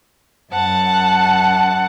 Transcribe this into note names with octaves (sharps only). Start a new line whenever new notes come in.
F#2 F#5 A5